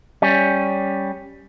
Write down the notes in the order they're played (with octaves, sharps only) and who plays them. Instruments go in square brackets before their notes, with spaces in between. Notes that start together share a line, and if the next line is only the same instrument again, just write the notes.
[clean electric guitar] G3 C#4